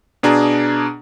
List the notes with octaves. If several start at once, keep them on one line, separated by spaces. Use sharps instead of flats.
B2 D4 G#4 A#5